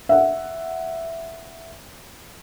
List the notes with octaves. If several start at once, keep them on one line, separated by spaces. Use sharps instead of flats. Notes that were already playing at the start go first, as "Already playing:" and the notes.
E5 F#5